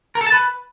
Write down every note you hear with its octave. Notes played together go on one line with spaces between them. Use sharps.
A#4
A4
A5
B4